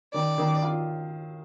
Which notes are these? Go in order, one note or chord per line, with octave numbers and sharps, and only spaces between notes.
D#3 D5
D#3
F4